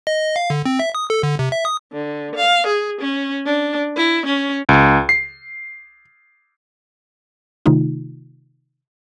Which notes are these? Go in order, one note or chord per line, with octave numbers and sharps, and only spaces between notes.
D#5
F5
D3
C4
E5
D#6
A4
D3
C3
E5
D#6
D3
F5
G#4
C#4
D4
E4
C#4
C#2
C7
C3 D#3 A3 D#4 F4